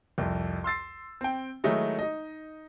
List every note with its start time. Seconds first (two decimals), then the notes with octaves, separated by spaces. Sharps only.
0.18 C2 F2
0.64 C6 E6 A6 C7
1.21 C4 G5
1.64 D#3 F#3 G#3 A3 D#4 E4
1.99 D#4 D#5